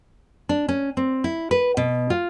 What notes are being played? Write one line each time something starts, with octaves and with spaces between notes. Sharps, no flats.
D4
C#4
C4
E4
B4
B2
F4